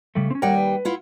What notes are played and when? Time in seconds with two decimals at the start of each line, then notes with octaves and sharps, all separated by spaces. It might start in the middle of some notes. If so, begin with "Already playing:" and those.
0.15 C#3 G3 A3
0.31 C4 C#4
0.42 D#2 G3 A#4 C#5 F#5 G5
0.57 B4
0.85 E4 F4 F#5